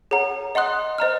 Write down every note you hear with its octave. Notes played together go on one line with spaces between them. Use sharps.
G#4 C#5 F#5 A#5
D#5 F#5 C6 D#6 F#6
C5 D#5 A#5 F6